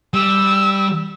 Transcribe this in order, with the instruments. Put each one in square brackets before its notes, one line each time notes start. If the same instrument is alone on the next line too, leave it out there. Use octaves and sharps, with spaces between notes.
[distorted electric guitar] G3 [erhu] E6